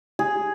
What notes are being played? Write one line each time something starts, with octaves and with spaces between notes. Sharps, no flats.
G#4